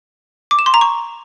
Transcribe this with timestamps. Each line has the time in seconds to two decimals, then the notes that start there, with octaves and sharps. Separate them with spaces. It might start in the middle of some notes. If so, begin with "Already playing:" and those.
0.51 D6
0.59 E7
0.66 C6
0.74 A#5
0.81 C#6